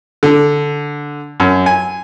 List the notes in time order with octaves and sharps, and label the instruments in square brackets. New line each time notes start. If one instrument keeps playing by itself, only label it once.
[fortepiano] D3
F#2
G#5